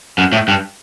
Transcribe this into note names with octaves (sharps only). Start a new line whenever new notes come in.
F#2
A2
G2